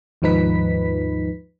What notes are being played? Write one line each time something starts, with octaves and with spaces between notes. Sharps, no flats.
D#2 G#2 F3 D#4 B4 B6